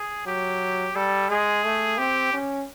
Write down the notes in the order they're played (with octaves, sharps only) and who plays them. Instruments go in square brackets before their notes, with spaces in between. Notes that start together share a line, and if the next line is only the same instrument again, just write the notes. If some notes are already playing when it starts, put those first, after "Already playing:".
Already playing: [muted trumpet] G#4
[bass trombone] F#3 [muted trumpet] G4
[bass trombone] G3 [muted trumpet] A4
[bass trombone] G#3 [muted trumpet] G#4
[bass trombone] A3
[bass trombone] C4 [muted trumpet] G4
[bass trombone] C#4